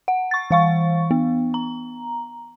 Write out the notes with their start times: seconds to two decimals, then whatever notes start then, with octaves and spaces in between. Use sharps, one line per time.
0.08 F#5
0.31 C#6 A6
0.51 E3 F5 C#6
1.11 B3
1.54 A#5